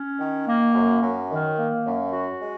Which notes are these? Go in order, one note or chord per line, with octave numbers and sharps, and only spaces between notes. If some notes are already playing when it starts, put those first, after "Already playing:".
Already playing: C#4
D#3
A#3
F#2
F#2
D#3
A#3
F#2
F#4
G#3